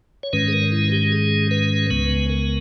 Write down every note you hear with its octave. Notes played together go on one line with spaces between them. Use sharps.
C#5
G#2 D#3 G#3 C#4 B4
G#4
A#4
E4
G4
G#4
B4
C#2 C#3 G#3 B3 B4
A#4